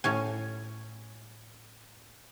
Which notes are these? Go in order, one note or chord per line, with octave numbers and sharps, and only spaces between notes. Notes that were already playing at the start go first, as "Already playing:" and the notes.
A2 C#4 G#5